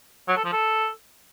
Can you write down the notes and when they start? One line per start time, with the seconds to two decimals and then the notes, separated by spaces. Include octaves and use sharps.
0.28 F#3
0.36 A4
0.44 F3
0.53 A4